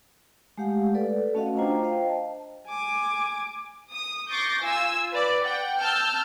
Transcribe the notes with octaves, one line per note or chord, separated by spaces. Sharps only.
G#3 A3 G4 F5 F#5
A4 B4 D5
A3 C#4 F#4 D#5 F5 F#5
D4 F4 C5 G5 A#5
C5 D#5 F5 G5
A5
G#5 D6
D#6
C#6 D6 G6 A6 A#6 C7
F4 G#5 E6
B4 D5
F#5 G5
A5 E6 F6 G6